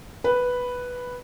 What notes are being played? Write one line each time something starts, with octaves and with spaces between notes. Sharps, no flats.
B4